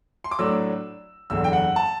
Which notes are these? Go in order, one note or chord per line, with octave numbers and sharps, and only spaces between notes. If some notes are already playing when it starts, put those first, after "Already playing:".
C6
D6
A2 F#3 A3 D4 E6
F#1 E2 D3 E6
G5
F#5
A5